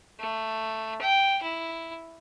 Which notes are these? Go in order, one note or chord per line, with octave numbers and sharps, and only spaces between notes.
A3
G5
E4